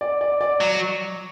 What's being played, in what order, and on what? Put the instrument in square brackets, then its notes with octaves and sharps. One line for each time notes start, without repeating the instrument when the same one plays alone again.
[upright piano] D5
D5
D5
[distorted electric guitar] F#3